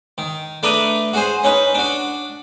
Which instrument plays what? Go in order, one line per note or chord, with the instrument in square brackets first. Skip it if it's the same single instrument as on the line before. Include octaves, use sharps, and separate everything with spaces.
[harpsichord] D#3
A3 D4 B4 D5 A#5 D#6
F#4 G#4 C5
C#4 D#4 B4
D4 F#4